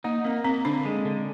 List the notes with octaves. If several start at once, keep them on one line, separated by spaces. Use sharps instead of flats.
A#3 D#4
A#3 C4
A#3 C4
D3 D4
G#3
D3